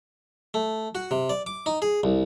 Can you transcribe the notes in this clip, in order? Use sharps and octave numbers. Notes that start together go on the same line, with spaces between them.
A3
F#4
C3
D5
D6
D#4
G#4
C2